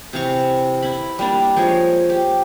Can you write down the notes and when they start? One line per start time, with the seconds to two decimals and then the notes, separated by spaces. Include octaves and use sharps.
0.13 C3 E3 F5 C#6
0.82 E4 B5
1.19 G3 A#3 D4
1.56 F3 G#3 C#5
2.10 G4